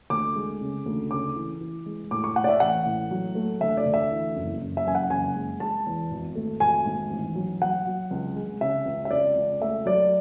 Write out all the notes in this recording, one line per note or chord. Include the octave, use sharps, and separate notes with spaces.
D2 D6
G#3
C#3
D2
C#3 D6
E3
E3
G#3
A2 D6
C#6
A2 F#5
D5
E5
A1 F#5
A2
F#3
A3
D2 E5
D5
D2
E5
E3
F#1
F#1
E5
F#2 G#5
F#5
F#1 G#5
G#3
G#3 A5
E2
G#1
A3
G#1 G#5
G#2
A1
F#3
F#3 F#5
F#3
C#2
G#3
C#3 E5
C#2
E5
C#2 D5
C#2
A3 E5
F#3 D5